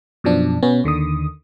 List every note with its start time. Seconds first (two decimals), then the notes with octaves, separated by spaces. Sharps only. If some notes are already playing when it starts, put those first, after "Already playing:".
0.24 F#2 B2 F3 D4
0.63 B2 B3 C#4
0.84 D#2 D3 D#3 D#6